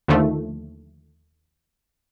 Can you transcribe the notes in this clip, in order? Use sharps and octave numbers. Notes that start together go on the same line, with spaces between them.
D#2 D3 D#3 F3 A3